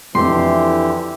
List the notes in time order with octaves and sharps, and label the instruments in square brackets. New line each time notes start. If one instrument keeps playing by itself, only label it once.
[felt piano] F2 [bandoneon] D3 G4 [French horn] E3 [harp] C6